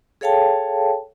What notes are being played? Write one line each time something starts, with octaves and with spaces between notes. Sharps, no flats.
G#4 A4 C#5 F5 G5 A5